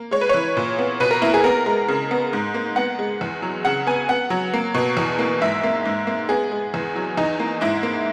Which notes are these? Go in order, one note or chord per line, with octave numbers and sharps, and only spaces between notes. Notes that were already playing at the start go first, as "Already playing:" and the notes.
Already playing: A#3
G#3 C#5
B4
E3 C#5
A#2
B3
B2 B4
A#4
A#3 E4
G#4
B3 A#4
G#3
C#3
B3
G#2
A#3
B3 F#5
G#3
E2
F#3
C#3 F#5
B3 G#5
B3 F#5
F#3
A#3
B2
E2
A#3
G#2 E5
A#3
G#2
A#3
B3 G#4
G#3
E2
F#3
E2 D#4
A#3
G#2 E4
A#3